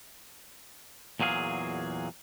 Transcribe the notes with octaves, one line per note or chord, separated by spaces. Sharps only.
E2 A#2 F#3 G#4 F5